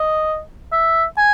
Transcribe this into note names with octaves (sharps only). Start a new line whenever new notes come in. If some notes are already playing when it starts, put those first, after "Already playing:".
Already playing: D#5
E5
G#5